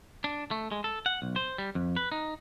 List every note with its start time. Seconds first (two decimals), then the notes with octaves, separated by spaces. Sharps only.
0.24 D4
0.51 A3
0.72 G#3
0.84 A4
1.06 F#5
1.22 B1
1.36 C5
1.58 G3
1.75 F2
1.96 B4
2.12 D#4